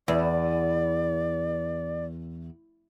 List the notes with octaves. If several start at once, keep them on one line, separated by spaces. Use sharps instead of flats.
E2 D5